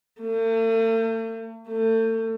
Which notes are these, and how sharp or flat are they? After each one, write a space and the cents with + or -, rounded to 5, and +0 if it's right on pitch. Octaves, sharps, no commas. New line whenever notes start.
A3 +45
A3 +35